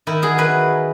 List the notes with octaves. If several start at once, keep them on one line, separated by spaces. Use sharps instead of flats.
D#3 E4
F#3 G#4
F#3 B4